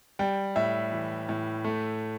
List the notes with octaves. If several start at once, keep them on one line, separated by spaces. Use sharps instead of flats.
G3 G5
A2 E5
E3
A2
A3